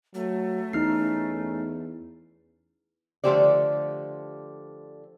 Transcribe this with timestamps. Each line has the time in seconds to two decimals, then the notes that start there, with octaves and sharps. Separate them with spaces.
0.15 F#3 A3
0.73 E2 C#4 D#4 F6 C7
3.24 D3 F3 A3 G4 C5 D5